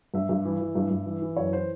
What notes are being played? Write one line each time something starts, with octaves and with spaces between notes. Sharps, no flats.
G2 E5
G2
E3
E3
G2
G2
E3
E3
F#2 C#5
E3 C5